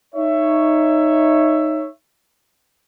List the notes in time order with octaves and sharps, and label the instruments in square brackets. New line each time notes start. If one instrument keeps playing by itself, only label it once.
[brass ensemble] D#4 C#5 E5